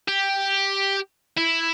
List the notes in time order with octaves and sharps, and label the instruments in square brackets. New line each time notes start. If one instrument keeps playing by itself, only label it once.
[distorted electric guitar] G4
E4